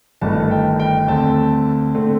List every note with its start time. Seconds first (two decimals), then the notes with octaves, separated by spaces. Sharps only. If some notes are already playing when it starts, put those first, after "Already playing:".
0.21 G1 G2 D#3 A3 A5
0.51 G5
0.80 G5
1.08 D2 D3 A3 C4 A5
1.95 D3 A3 C4